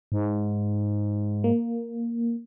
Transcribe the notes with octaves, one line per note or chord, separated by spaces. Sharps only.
G#2
A#3